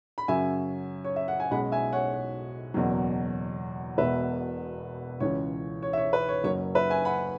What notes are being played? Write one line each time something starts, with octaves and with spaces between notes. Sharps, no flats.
B5
F#2 C#3 F#3 C#4 E5 G#5
C#5
E5
F#5
G#5
B1 B2 G#3 C#4 F#5 B5
E5 G#5
C#5 F#5
C#5
F#1 E2 B2 F#3
E1 E2 B2 B4 E5
C#2 C#3 E3 C#4 C#5
C#5
E5
C#5
B4
C#5
F#1 F#2 F#3 C#4 C#5
B4 E5
E5 G#5
F#5 B5